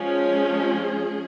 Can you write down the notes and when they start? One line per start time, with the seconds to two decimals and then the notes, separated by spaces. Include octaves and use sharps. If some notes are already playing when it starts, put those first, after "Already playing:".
Already playing: F3 G#3 C#4
0.52 G#4